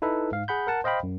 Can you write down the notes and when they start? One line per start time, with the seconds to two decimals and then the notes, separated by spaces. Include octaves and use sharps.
0.02 D#4 E4 A4 B4 E5
0.32 G#2 F5
0.48 G#4 F#5 B5 G6
0.67 A#4 F#5 A5
0.84 C5 D#5 F5 G5 B5
1.03 F#2